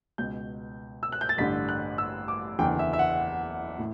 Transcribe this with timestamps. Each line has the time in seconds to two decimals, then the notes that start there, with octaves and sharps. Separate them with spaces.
0.18 C#2 B2 G6
1.03 E6
1.12 F#6
1.21 G6
1.29 A6
1.38 A1 G2 D3 B6
1.69 F#6
1.98 E6
2.28 D6
2.59 F#1 E2 D3 G5
2.79 E5
2.93 E5
2.99 F#5
3.79 A2